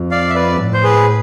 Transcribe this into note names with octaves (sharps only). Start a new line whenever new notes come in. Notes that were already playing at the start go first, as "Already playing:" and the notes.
Already playing: F2
D5 F5
E5
B4 D5
A2
C5
G#4 B4